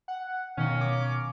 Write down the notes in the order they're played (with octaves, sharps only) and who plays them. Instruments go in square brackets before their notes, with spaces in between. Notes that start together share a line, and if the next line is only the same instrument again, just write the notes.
[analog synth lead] F#5
[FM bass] B2 [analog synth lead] D#3 [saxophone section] A#3 C#4
[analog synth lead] D6